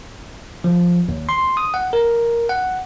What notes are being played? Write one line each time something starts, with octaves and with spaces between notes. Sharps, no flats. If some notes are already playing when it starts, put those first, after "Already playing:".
F3
D#2
C6
D#6
F#5
A#4
F#5